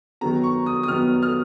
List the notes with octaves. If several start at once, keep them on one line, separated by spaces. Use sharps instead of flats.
D#3 F#3 B3 A#5
C#6
D#6
D#6
D#3 F#3 B3 F6
F6